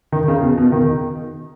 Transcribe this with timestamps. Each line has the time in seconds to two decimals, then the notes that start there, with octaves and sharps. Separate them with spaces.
0.12 D#3
0.28 C#3
0.43 B2
0.58 B2
0.72 D#3